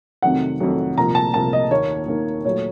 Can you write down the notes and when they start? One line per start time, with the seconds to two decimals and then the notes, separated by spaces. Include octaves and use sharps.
0.22 F2 C3 D#3 F#3 A3 F#5
0.60 F2 C3 D#3 F#3 A3
0.97 C2 A#2 F3 A#3 A#5
1.15 A5
1.34 C2 A#2 F3 A#3 A5
1.53 D#5
1.71 D#2 D#3 A#3 C#5
2.08 D#2 D#3 A#3
2.45 A#2 F#3 A3 C#5